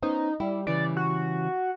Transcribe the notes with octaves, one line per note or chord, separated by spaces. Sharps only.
B3 C#4 D#4 C5
G3 E4
C#3 E3 G3 D5
F#4